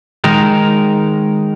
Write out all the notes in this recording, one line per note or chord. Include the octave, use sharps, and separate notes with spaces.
D#3 G#3 D#4 A#4